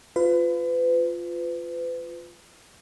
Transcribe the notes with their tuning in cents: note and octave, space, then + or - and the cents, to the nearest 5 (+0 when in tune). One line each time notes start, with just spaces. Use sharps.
F4 +0 B4 +35